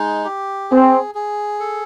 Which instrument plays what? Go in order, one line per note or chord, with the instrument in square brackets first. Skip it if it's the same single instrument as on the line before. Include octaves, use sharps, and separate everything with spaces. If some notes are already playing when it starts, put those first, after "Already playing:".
Already playing: [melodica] G#3 D#4
G4
[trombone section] C4 [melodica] G#4
[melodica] G#4
A4